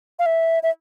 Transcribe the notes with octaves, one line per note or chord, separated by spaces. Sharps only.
F5
E5
E5